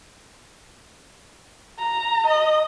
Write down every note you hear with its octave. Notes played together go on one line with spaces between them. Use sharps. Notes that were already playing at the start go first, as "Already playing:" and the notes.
A#5
D#5